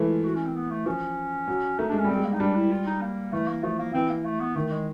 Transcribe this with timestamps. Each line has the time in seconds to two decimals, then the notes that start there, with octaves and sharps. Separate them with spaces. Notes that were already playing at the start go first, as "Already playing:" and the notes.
Already playing: E3 G#3 A3
0.09 F4
0.24 F#4
0.35 C#4
0.46 C4
0.55 B3
0.71 A3
0.86 F3 C#4
1.48 F#3
1.79 A3 D#4
1.89 G#3 D4
1.99 C#4
2.04 G3 C4
2.17 G#3
2.25 A#3
2.33 D#4
2.40 G3 D4
2.55 E4
2.71 F4
2.87 D#4
3.01 A#3
3.33 E3 A3
3.48 A#3
3.63 F3 A3
3.79 A#3
3.94 E3 C4
4.10 A#3
4.25 A3
4.40 B3
4.56 D#3 A3
4.71 G#3